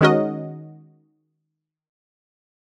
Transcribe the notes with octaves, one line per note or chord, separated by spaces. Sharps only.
D#3 G#3 C#4 F#4 A#4 D#5